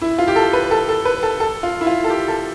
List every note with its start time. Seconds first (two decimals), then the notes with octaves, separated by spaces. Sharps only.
0.02 E4
0.18 F4
0.28 G4
0.36 A4
0.53 B4
0.71 A4
0.89 A4
1.05 B4
1.23 A4
1.40 A4
1.63 F4
1.81 E4
1.87 F4
2.04 A4
2.10 G4
2.28 A4